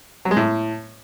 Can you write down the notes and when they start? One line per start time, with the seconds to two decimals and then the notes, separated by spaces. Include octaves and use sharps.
0.25 F#3
0.31 G#3
0.37 A2